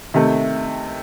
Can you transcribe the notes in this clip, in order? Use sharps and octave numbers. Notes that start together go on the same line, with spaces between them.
C3 D#3 A3